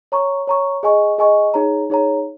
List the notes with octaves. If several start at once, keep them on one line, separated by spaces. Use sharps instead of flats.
C#5 A#5 C#6
C#5 A#5 C#6
G#4 D#5 G#5 C#6
G#4 D#5 G#5 C#6
D#4 G#4 C#5 A#5
D#4 G#4 C#5 A#5